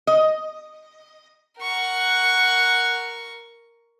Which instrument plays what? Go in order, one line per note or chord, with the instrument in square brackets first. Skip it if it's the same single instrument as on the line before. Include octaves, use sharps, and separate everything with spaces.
[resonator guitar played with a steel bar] D#5
[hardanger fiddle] A#4 C#6 [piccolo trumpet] F#5